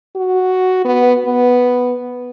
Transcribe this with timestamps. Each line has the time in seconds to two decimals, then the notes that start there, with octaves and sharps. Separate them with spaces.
0.16 F#4
0.84 B3
1.25 B3